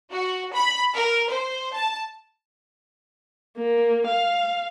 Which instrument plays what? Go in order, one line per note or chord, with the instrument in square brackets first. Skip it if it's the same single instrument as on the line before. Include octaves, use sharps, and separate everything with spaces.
[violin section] F#4
B5
A#4
C5
A5
[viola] A#3
F5